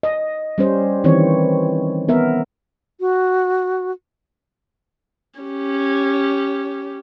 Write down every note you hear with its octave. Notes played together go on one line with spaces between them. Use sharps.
D#5
G3 C#4 C5
D#3 E3 C4 C#5
B3 A#4 E5
F#4
C#4 G4